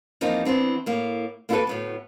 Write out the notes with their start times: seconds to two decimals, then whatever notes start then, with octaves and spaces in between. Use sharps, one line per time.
0.21 E2 F3 A#3 C4 D#4
0.45 E3 B3 C4 D4
0.86 A2 A#3
1.49 A#3 B3 E4 F#4 A4 B4
1.67 D2 A2 B3